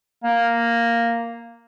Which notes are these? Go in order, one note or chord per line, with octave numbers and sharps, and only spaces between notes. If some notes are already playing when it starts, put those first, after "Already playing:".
A#3